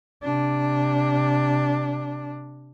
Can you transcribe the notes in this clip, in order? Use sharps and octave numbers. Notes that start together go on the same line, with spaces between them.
C3 D4